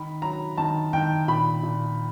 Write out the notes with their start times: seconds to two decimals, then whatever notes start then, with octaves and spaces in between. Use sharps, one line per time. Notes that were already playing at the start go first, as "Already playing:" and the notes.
Already playing: D#3 B5
0.22 F#3 A#5
0.57 D#3 A5
0.93 D#3 G5
1.28 A#2 B5
1.63 A#2